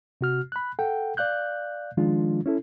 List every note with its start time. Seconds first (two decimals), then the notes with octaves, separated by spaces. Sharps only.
0.21 C3 F#4 F6
0.52 B5 F#6
0.79 A4 F#5 G5
1.17 D5 F5 F#6 G6
1.97 D#3 F3 G#3 D4 F4
2.46 C#4 E4 A4